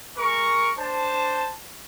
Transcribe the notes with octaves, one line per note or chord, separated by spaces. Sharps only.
G#3 A#4 C#6
D4 C5 A5